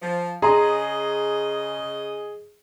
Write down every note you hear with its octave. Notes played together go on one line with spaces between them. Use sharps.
F3
C#3 G#4 D#5 A#5 C6